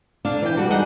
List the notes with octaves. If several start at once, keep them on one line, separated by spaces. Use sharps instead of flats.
D3 D4 F5
E3 G5
G3 F#4 A4
G3 D4 D#4 G#4 D#5 F#5